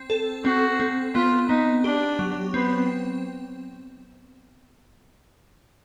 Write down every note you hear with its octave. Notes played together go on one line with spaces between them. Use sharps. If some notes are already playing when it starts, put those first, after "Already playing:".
Already playing: C4
A4
C4 F#4
C4
B3 F4
B3 D#4
D4 G4
F#3
B3 C4